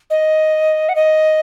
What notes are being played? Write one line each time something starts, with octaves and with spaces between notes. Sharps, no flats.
D#5
F#5
D#5